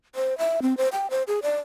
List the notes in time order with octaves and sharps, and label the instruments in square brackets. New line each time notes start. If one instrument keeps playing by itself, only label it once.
[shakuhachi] C5
E5
C4
C5
G5
C5
G#4
D5